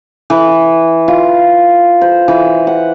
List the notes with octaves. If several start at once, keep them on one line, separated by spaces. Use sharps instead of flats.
E3
F4
C5
E3
F#5